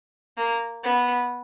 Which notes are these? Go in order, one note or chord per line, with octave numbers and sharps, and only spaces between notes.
A#3
B3